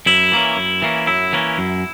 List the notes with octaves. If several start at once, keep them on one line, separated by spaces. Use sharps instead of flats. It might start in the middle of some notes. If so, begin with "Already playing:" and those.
F#2 E4
E3 A#3 C#4
F#2
E3 A#3 C#4
F#2 E4
E3 A#3 C#4
F#2